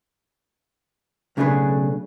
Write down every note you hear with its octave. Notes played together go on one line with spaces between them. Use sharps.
B1 C#3 A3 D4 G#4 B4